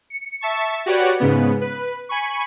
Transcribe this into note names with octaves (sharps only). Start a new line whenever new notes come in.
C#7
E5 A5 C#6
F#4 G4 B4 C#5 D5 F#5
G#2 C#3 B3
B4
G#5 B5 C#6